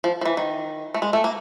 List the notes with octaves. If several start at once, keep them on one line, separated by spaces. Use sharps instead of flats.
F3
F3
E3
D#3
A3
G#3
A3
A#3